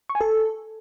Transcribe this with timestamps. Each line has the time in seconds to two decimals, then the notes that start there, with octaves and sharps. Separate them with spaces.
0.09 C#6
0.15 G#5
0.21 A4